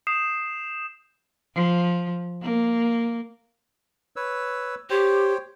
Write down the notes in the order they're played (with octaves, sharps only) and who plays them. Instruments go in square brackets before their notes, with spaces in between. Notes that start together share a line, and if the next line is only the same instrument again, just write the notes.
[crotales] D#6 G6 C7 E7
[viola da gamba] F3
A#3
[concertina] B4 C#5 E6
[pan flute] G4 [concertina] C5 C#5 G5